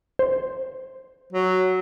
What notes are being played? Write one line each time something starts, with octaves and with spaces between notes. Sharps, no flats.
C5
F#3